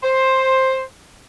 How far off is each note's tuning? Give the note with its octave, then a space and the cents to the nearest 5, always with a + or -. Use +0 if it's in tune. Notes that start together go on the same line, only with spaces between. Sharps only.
C5 +10